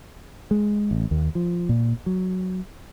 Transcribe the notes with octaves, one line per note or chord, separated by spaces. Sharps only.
G#3
A1
D#2
F3
A#2
F#3